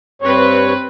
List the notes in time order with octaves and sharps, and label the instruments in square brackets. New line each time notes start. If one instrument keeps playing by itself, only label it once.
[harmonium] G2 C#5 [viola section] C4 B4